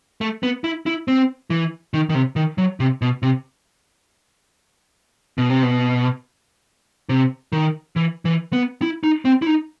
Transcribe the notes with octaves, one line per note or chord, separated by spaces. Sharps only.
A3
B3
E4
E4
C4
E3
D#3
D#3
C3
D#3
F#3
C3
B2
C3
B2
C3
B2
C3
D#3
E3
E3
B3
E4
D#4
C4
E4
D#4